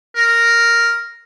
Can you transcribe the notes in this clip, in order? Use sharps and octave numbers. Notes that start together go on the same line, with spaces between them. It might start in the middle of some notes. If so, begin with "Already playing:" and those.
A#4